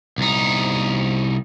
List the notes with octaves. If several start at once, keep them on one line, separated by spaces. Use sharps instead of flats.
C2 D#4